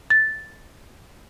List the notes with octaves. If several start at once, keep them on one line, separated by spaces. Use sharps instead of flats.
A6